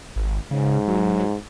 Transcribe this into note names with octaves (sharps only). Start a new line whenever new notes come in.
G#1
G#2 C#3
F#3